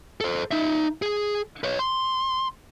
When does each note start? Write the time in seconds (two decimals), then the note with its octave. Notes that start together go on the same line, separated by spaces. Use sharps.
0.21 A4 C5
0.51 D#4 E5
1.02 G#4 G#5
1.64 B4 C#5
1.79 C6